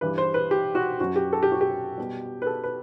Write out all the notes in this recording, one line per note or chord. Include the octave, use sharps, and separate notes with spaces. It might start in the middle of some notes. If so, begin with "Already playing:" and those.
G2 E3 G3 B4
C5
B4
G4
F#4
F#2 F#3 F#4
G4
A4
G4
F#4
G4
B2 G3
B4
A4
B4